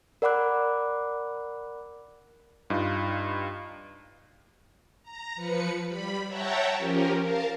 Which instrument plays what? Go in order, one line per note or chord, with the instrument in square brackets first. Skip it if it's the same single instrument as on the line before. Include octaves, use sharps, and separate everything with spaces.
[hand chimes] A#4 D5 F#5 B5 D6 F#6
[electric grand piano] G2 D#4 F4
[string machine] A#5
F3 B4 C#7
G3 B5
C#5 E5 F#5 G5 A5 A#5
F3 C#4 G4 A#4
A#4 F5 A5